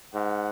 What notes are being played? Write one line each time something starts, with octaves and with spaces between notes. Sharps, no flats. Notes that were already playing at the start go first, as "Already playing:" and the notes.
G#2 F#5